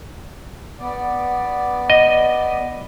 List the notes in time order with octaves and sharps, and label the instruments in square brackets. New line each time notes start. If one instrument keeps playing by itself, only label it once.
[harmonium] B3 D5
[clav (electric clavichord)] D#5